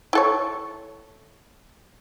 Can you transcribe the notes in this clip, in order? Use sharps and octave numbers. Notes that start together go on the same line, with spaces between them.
E4 A4 C#5